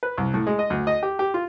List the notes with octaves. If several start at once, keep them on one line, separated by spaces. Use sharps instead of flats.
B4
C2
A2
G#3
D#5
D2
D#5
G4
G4
F4